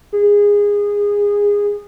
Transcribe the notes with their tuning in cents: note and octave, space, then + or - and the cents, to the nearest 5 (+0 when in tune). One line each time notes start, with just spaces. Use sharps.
G#4 -20